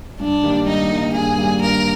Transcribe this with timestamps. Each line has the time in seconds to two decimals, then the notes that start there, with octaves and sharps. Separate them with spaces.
0.20 G2 D4
0.43 D#3 G3 A#3
0.66 G2 D#4
0.90 D#3 G3 A#3
1.14 G2 G#4
1.37 D#3 G3 A#3
1.61 G2 A#4